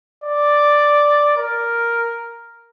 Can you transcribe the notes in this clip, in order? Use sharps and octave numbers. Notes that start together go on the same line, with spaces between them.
D5
A#4